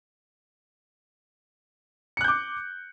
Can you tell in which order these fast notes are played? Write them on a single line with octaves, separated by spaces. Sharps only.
C#7 F#6 G6 D6